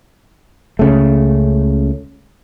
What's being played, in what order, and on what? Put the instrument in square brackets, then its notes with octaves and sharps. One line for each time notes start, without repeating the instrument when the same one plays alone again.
[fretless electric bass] C#2 C#3 A3